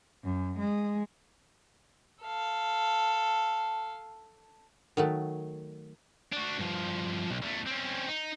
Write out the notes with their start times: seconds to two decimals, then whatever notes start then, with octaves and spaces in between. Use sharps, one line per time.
0.24 F#2
0.58 G#3
2.24 A4 F5
4.97 D#3 F#3 A3
6.33 D4 F#4
6.59 G2 F3
7.29 B1
7.42 E2 A3
7.66 C4 C#4
8.08 D#4